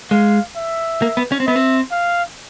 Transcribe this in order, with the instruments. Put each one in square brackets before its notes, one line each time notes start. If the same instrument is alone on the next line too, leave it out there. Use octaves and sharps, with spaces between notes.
[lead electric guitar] G#3 [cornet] F5
[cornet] E5
[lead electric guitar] A#3
B3
C#4
C4
[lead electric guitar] B3 [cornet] E5
[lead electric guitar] C4
[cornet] F5